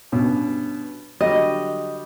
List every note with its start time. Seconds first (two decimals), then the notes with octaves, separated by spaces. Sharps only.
0.12 G2 B2 C#4
1.21 D3 F#3 G3 D#5